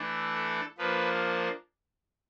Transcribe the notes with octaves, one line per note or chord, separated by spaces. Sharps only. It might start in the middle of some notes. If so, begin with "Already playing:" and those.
Already playing: E3 A3 D4
A4
F3 A#3 D4 B4